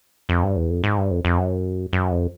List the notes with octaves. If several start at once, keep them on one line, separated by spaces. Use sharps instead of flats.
F2
G2
E2
F2
G#2
G2
F2
F2
F#2
F#2
F2